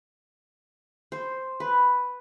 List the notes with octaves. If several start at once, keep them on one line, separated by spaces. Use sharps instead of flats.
C5
B4